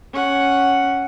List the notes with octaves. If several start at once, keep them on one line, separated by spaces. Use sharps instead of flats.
C#4 F#5